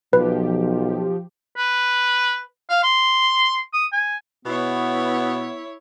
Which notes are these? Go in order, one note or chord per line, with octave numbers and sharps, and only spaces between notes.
B1 F3 G4 B4
B4
F5
C6
D#6
G#5
B2 B3 E4 C#5